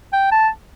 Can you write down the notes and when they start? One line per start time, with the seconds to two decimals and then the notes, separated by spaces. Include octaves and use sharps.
0.13 G5
0.32 A5